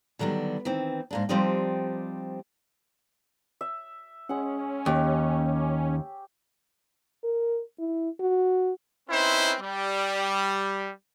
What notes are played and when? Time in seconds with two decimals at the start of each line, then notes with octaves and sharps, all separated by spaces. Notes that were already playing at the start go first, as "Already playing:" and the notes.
0.19 D3 D#3 F#3 G3 B3
0.65 D#3 E3 C4
1.11 G#2 A#3 D4
1.29 F3 G3 C4 D4 D#4 G4
3.61 E5
4.29 G#3 C#4 F#5
4.86 D#2 G4 C#5
7.24 A#4
7.79 E4
8.20 F#4
9.09 C4 C#4 D#4 E4 B4 C5
9.61 G3